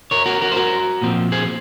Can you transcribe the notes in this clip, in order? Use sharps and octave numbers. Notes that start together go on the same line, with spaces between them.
A#4 C#5
F#4 A#4
F#4 A#4
C5
F#4 A#4
A#2 F3 C4
G#4 C5